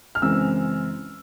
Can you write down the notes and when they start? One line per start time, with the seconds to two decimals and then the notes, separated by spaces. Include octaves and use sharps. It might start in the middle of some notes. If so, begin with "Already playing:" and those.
0.15 F6
0.22 F#2 C#3 E3 G#3 C4 E6